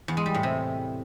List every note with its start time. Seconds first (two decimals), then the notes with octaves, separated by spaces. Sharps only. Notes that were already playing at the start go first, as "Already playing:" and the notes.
0.08 E2
0.17 G#3
0.26 G3
0.34 A2
0.43 C3